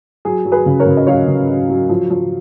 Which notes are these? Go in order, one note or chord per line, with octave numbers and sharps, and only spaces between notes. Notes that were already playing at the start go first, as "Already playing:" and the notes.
F#3 G#4
F#3
G#4 B4
C#3
A#4 C#5
C#3
D#5
F#3 C#5 F5
C#3
F#3
F#3
F3
F3